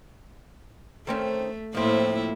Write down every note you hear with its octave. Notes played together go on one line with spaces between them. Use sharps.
D#3 A3 C4 C#4
A2 F3 A#3 C4 E4